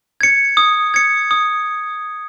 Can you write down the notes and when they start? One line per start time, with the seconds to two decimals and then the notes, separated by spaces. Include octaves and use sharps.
0.21 G#6 C#7
0.57 D#6
0.94 G#6 C#7
1.31 D#6